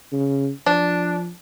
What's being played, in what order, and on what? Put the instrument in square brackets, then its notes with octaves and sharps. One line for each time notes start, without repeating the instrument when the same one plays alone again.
[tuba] C#3
[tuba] F3 [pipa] D4